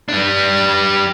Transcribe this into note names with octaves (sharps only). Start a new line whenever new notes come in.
G3 D4